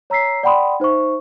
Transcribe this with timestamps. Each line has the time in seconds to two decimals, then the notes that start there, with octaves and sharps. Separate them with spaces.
0.10 C#5 A#5 E6 B6 C7
0.43 D5 F#5 G5 B5 C6 D#6
0.80 D#4 C5 E5 C#6